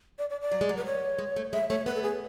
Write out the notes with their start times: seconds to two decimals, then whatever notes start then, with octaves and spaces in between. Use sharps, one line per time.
0.19 D5
0.30 D5
0.41 D5
0.52 F#3
0.61 G#3
0.69 F#3
0.77 B4
0.86 C#5
1.18 G#3
1.36 A3
1.52 G#3 E5
1.69 A3 C#5
1.86 B3 B4
1.95 A4
2.03 G#4